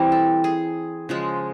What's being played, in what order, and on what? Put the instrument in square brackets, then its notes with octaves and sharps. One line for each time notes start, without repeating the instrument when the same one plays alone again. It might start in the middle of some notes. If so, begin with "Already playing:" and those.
Already playing: [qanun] E3 G3 C4
A4
G#4
C#3 F3 G#3